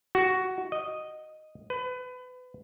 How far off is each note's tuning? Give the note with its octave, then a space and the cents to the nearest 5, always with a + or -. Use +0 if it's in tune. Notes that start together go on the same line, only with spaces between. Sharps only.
F#4 +10
D#5 -5
B4 +30